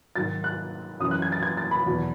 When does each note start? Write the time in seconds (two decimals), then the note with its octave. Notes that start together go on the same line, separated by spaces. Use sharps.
0.16 G#2 D#3 F#3 A6
0.44 F#6
1.00 F#2 E3 D#6
1.11 F#6
1.22 G#6
1.32 A6
1.43 G#6
1.57 A6
1.71 B5
1.86 E2 B2 F#3